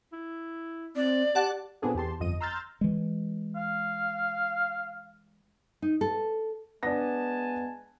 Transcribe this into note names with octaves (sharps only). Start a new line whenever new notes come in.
E4
C4 D5
G4 D5 F#5 A5 A6
A#2 B3 C4 D4 G#4 A4
E2 G4 A5 C6
G1 F2 D#5 D#7
A#5 C6 E6 F6 G6 A6
E3 G#3
F5
D#4
A4
G#3 B3 D4 G#5 A5 A#6